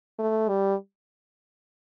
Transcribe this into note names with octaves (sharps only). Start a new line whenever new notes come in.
A3
G3